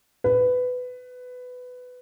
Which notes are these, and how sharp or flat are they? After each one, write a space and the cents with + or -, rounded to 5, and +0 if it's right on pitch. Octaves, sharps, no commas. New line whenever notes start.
B4 +15